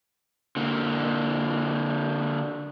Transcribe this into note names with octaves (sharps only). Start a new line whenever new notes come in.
D3 A#3